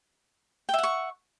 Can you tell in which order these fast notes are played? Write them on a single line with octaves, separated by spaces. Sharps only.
G5 E5 F#5 C#6